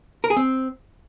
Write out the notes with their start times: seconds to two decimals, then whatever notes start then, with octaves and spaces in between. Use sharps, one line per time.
0.24 A#4
0.30 G#4
0.37 C4